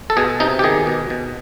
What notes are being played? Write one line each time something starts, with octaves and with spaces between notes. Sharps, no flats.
A4
B2 G#4
C3 D#4
G4
D#3 G#4
B2
B2